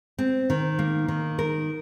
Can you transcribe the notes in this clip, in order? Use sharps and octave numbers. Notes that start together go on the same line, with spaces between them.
C4
D#3
A#3
D#3
A#4